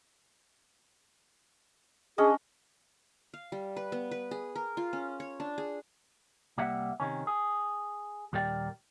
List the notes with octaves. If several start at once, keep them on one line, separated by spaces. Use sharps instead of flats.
C#4 D4 G#4 D#5
F5
G3
B4
B3
B4
G#4
A#4
F4
C#4
C#5
D4
G#4
C2 G3 A#3 E5 F#5
C3 D#3 C#4
G#4
D#2 A#2 G3 A#4 D5 G5